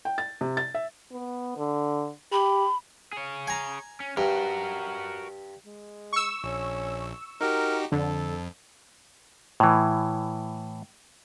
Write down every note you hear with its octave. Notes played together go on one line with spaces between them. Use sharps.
G5
A6
C3
A6
E5
B3
D3
G4 B5
G#4 C#5
G#5 A#5
C#4
G2 F#4 A#4
G#3
C#6 E6
A#1 C#4
D#4 F#4 G4 A#4
F2 D3 A4
A2 E3